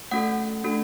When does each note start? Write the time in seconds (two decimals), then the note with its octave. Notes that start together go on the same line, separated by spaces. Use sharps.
0.11 A3 C#4 F#4 A4 F#5
0.64 A3 D4 F#4 A4